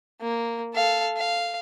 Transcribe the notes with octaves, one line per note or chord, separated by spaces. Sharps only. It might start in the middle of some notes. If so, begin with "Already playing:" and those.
A#3
A4 F5
F5